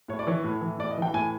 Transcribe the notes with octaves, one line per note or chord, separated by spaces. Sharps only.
A2 C#5
D5
E3 C#5
A2
E3
A2 D5
D#5
E3 G5
A2 G#5